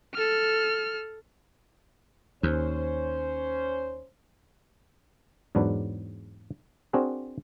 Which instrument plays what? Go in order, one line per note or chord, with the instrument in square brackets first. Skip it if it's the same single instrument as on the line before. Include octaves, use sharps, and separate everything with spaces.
[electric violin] A4 F6
[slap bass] D#2 [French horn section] C#4 C5
[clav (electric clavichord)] E2 G#2 F#3 D4 B4
C4 D4 F#4 G#4 A#4